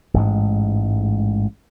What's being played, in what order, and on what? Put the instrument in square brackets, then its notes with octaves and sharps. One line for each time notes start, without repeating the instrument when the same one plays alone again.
[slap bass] A1 G#2 G#3